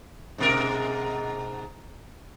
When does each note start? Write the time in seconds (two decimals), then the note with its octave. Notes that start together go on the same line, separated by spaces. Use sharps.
0.38 G#2 B2 A#4